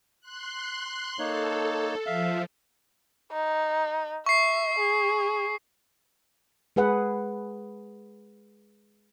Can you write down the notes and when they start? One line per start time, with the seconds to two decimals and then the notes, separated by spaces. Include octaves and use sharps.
0.21 C6 F#6
1.19 A#3 D#4 A4 C#5
2.06 F3 E5 F5
3.32 D#4
4.26 E5 C#6 C7
4.79 G#4
6.76 G#3 G#4 B4 F#5